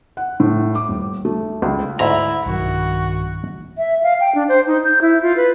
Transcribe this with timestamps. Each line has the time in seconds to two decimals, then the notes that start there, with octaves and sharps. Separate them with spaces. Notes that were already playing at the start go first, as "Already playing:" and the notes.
0.17 F#5
0.40 A2
0.75 D6
0.89 D#1
1.25 A3
1.62 C#2
1.99 D2 G#2 E4 A#5
2.46 B1 G2 D#3 F#4
3.78 E5
4.03 F5
4.20 G5
4.35 D4
4.49 C5
4.67 D#4
4.84 G6
5.02 E4
5.22 F4
5.37 B4